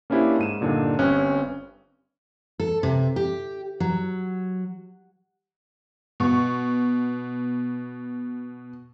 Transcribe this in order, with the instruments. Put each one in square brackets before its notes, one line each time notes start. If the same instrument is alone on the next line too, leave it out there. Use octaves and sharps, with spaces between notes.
[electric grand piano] A#3 C#4 D4 E4 G4 C5
G#2 D#7 E7
G2 A#2 D3 D4 D#4
G1 G2 C4 C#4 F#6
[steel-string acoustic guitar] A4
C3
G4
F#3
[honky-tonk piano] B2 C#6